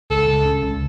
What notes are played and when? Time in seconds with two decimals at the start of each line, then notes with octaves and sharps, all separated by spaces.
0.10 C#2 A4
0.28 C#2
0.45 C#3
0.63 C#2